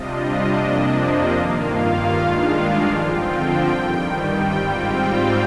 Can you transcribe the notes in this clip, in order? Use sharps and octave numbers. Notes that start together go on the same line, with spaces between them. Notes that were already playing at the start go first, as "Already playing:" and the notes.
Already playing: C3 G3 D4 F4 D#5
F2 C3 F3 A#3 D4
G2 D#3 A#3 F4 F5
G2 D#3 G#3 D4 F4
D3 F3 C4 F4 G5
G2 D#3 G3
G#2 G3 C4 F4 G5
F5